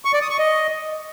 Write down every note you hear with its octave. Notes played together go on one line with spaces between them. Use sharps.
C#6
D5
D#6
C#6
D#5